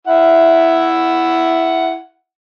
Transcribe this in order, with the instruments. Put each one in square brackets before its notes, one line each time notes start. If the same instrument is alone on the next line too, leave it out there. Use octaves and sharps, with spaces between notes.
[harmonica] E4 E5 F#5